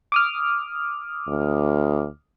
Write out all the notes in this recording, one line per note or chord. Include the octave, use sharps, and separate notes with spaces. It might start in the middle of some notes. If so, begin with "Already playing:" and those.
D6 D#6 F6
D2